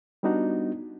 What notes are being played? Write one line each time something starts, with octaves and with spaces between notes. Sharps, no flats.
G3 B3 D4 D#4 F#4